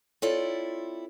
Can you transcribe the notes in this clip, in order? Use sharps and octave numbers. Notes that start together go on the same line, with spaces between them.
C4 E4 F4 A4 C#5 D5